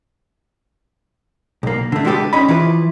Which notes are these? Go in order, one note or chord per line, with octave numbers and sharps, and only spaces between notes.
B1 A#3
D3 A3
D3 G#3 F#4 G4 A4 B4
D2 C#4 D#4 B5
E3 F3 E4 B4